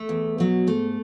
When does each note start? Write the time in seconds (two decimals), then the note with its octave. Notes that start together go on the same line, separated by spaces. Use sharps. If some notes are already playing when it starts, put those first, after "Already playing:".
Already playing: A3
0.09 E2
0.38 B2 F#3
0.67 G#2 A3